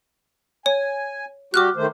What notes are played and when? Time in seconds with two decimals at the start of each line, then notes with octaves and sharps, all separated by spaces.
0.66 C#5 G#5
1.54 G3 F#4 G4 D6 F6 F#6
1.76 D#3 A3 C5